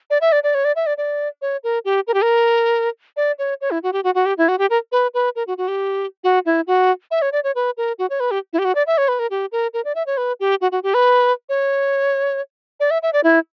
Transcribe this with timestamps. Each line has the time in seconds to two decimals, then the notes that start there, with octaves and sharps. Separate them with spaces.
0.10 D5
0.21 E5
0.32 D5
0.44 D5
0.55 C#5
0.65 D5
0.76 E5
0.87 D5
0.98 D5
1.42 C#5
1.64 A#4
1.85 G4
2.07 A#4
2.14 G4
2.22 A#4
3.17 D5
3.39 C#5
3.61 C#5
3.71 E4
3.83 F#4
3.93 G4
4.04 F#4
4.15 F#4
4.26 G4
4.38 E4
4.48 F#4
4.59 G4
4.70 A#4
4.92 B4
5.14 B4
5.36 A#4
5.47 F#4
5.58 F#4
5.68 G4
6.24 F#4
6.46 E4
6.67 F#4
7.11 E5
7.22 C#5
7.32 D5
7.44 C#5
7.55 B4
7.77 A#4
7.99 F#4
8.10 C#5
8.20 B4
8.31 G4
8.53 E4
8.59 G4
8.65 F#4
8.75 D5
8.87 E5
8.98 C#5
9.08 B4
9.19 A#4
9.30 G4
9.52 A#4
9.74 A#4
9.85 D5
9.95 E5
10.07 C#5
10.17 B4
10.40 G4
10.61 F#4
10.72 F#4
10.83 G4
10.94 B4
11.49 C#5
12.80 D5
12.91 E5
13.03 E5
13.13 D5
13.24 E4